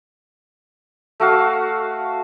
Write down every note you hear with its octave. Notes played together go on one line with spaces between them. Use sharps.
A3 F#4 F5